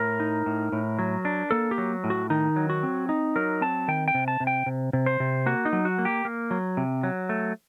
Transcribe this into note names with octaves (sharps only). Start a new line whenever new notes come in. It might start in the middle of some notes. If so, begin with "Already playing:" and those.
Already playing: A2 A#4
D#4
A2
A2
F#3
D4
A#3 A4
G4
F#3
A2
F#4
D#3 D#4
F#3
F#4
C4
D#4
F#3 A#4
C4 A5
D#3 G5
G5
C3
A5
C3
G5
C3
C3
C5
C3
A#3 F#4
D#4
F#3
F#4
A#3
G4
A#3
F#3
C3
F#3
A3